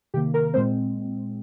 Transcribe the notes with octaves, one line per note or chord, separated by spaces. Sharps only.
C3 D#3 A#3 G4
A#4
A#2 G#3 C4 C5